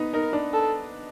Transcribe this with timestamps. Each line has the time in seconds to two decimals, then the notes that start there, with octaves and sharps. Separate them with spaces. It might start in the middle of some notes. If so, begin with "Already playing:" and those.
Already playing: B3 D#4
0.14 D#4 A#4
0.33 D4
0.53 A4